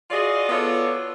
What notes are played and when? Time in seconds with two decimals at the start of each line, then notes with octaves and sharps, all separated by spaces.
0.10 F4 F#4 G#4 D5 D#5
0.49 B3 F4 A4 C#5 D5